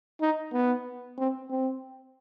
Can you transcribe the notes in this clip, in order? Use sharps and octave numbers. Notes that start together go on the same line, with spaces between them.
D#4
B3
C4
C4